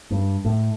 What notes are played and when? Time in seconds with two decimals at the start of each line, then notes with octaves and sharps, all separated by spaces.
0.11 G2
0.45 A2